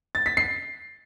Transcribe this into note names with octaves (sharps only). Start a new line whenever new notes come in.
A6
B6
C7